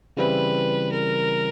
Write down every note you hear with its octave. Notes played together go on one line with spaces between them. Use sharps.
C#3 E3 G3 C4 E4 B4
A#4